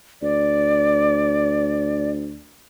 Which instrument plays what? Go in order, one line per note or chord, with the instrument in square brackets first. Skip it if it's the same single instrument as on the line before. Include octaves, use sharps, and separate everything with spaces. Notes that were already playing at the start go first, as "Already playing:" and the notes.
[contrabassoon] D2 [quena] D5